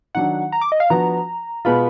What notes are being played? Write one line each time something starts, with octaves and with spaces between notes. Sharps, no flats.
D#3 F#3 D4 F#5
A#5
D6
D#5
F5
F3 B3 D4 F#4 A#5
B2 G#3 B3 F4 B5